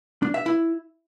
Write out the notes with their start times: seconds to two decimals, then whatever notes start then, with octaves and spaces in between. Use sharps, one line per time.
0.22 D4
0.34 E5
0.46 E4